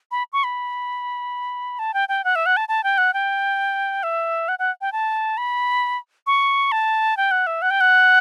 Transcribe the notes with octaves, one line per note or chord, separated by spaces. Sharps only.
B5
C#6
B5
A5
G5
G5
F#5
E5
F#5
A5
A5
G5
F#5
G5
E5
F#5
F#5
G5
A5
B5
C#6
A5
G5
F#5
E5
F#5
G5
F#5